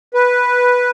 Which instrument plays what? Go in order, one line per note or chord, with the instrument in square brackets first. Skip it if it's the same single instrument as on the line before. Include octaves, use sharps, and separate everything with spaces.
[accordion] B4